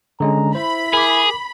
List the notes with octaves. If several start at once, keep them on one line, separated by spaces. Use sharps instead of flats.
D3 G#3 C#4 A#5
E4 C5 B5
G#4 A#4 D6